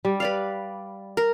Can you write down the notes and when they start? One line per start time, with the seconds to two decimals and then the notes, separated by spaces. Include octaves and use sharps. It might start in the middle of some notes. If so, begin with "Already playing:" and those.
0.05 G3
0.20 B4 D5 F5
1.17 A#4